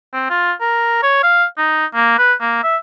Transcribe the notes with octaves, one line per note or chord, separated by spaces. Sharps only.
C4
F4
A#4
C#5
F5
D#4
A#3
B4
A#3
E5